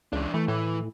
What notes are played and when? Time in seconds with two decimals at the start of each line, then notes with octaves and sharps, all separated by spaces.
0.13 C#2 E3 D4
0.34 E3 A3
0.48 A2 E3